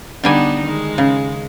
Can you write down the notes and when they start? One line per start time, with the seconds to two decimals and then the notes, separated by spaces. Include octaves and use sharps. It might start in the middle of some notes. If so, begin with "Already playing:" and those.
0.23 D3 G3 B3 D4 D#4 G#5
0.65 D#3 G#3
0.98 C#3